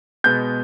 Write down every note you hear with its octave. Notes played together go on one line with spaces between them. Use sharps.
B2 G#3 B3 G6